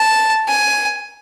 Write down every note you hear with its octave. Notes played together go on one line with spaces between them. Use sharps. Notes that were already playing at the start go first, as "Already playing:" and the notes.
Already playing: A5
G#5